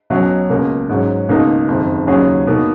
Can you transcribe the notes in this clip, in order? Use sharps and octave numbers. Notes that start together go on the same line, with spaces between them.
B1 B2 F#3 C#4
C#2 B2 A#3
G#2 F#3 C#4
C#2 B2 A#3 D#4
F#1 F2 D#3
D#2 C#3 F#3 C#4 G#4
B2 A#3 D#4